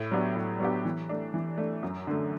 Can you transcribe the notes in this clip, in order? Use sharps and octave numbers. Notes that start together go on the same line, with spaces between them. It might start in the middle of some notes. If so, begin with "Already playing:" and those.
Already playing: A2
F#3 B3 D4 G4
A2
F#3 B3 D4 G4
E3
A3 D4
E3
A3 D4
F#2
D3 A3